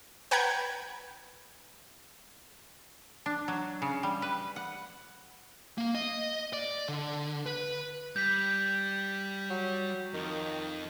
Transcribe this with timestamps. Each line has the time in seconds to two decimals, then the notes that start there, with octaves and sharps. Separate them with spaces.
0.31 B4 F#5 G5 A#5 G6 G#6
3.26 D4
3.48 F#3
3.82 C#3
4.03 G3
4.22 B4
4.56 F#5
5.78 A#3
5.95 D#5
6.53 D5
6.89 D3
7.46 B4
8.16 G3 G6 B6
9.50 F#3
10.14 F2 D#3